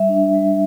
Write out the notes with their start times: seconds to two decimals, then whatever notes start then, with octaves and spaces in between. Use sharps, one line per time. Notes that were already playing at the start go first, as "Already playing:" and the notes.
Already playing: G3 E5
0.09 D4
0.34 G3